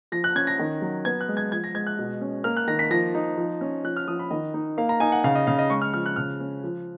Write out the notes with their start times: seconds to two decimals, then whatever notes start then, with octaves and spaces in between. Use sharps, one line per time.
0.12 F3 A#6
0.24 F#6
0.35 C#4 G#6
0.47 A#6
0.59 D#3
0.82 F#3
1.05 B3 G#6
1.21 F#6
1.28 G#3
1.37 G#6
1.52 F3 G#6
1.64 A#6
1.74 G#3 G#6
1.87 F#6
1.99 B2
2.21 C#4
2.44 A#3 F6
2.57 F#6
2.68 D#3 A#6
2.79 B6
2.91 F3 A#6
3.15 D#4
3.37 F3
3.61 C#4
3.84 F3 F#6
3.97 F6
4.07 F3 D#6
4.19 B5
4.31 D#3 D#5
4.54 D#4
4.78 A#3 F5
4.89 A#5
5.00 D#4 G#5
5.12 F#5
5.24 C#3 F5
5.35 D#5
5.47 C#3 F5
5.59 D#5
5.70 G#3 C#6
5.82 F6
5.94 F3 F6
6.06 F#6
6.16 C#3 F6
6.40 C#4
6.64 F3